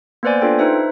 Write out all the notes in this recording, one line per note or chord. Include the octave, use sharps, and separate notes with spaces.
A#3 B3 B4 C5 D5 G#5
D4 F4 A4 G5
D#4 B4 C5 E5